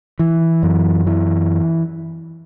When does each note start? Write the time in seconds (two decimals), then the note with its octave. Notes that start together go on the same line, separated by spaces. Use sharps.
0.19 E3
0.63 F#2
1.07 E3